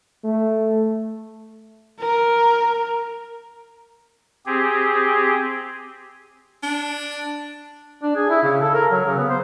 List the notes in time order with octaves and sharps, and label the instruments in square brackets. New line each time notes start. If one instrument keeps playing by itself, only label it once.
[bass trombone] A3
[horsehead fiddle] A#4
[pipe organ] C4 G4 G#4
[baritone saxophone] D4
[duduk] D4
G#4
E4
C#3
A4
A#4
F#3
C#3
B3
C5